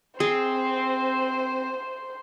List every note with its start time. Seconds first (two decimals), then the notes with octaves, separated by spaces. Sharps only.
0.20 C4 G#4 C5